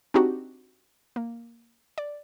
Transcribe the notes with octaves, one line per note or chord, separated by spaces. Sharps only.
C4 D4 D#4 F#4 G4
A#3
D5